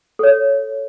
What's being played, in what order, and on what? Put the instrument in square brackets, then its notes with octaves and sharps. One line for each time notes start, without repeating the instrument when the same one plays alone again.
[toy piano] A4 C#5